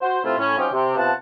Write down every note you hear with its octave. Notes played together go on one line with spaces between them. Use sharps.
F#4 C5
C3 A3 C4 E4 F4
A2 C#4
F#3 C4 C#4 D#4 F4 G4
C3
C3 B3 F4 F#5 A5